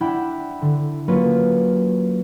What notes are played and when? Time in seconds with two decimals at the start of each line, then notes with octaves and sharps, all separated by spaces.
0.01 D4 E4 E5 F#5 G5 B5
0.62 D3
1.08 F#3 A#3 C#4 F4 B4 C#5